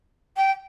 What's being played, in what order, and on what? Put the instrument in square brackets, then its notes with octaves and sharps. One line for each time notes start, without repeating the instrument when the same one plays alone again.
[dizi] G5